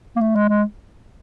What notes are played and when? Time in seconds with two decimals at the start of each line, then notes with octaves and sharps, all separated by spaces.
0.16 A#3
0.21 A3
0.35 G#3
0.49 G#3